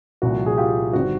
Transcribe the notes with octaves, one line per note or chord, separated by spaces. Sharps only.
C2 A#2 F3 F#4
G#4
F4 G4
G1 D#3 G3 C4 F#4